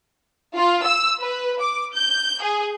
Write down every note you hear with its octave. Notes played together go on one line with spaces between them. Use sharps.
F4
E6
B4
D6
G6
G#4